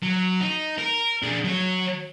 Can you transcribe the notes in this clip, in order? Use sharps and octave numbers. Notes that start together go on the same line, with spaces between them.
F#3
D#4
A#4
D4 G#4
F#3 C#5